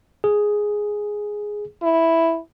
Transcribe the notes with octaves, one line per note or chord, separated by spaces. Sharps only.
G#4
E4